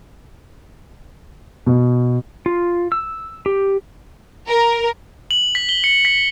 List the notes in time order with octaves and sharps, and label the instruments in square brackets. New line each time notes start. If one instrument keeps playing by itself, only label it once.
[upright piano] B2
[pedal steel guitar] F4
E6
G4
[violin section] A#4
[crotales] F#7
B6
G7
C#7
B6